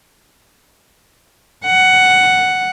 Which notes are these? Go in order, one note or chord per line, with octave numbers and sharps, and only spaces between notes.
F#5